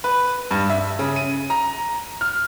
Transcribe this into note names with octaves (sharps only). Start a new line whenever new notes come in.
B4
G2
E5
C#3
D#7
A#5
F6